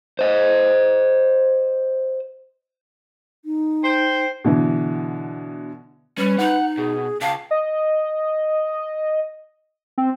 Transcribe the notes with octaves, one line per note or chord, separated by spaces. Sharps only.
C5 D#5
D#4
C5 G5
B2 D3 E3
G3 C#4 B4
D#4 F#5
B2 G#4
C#2 F5 A5
D#5
C4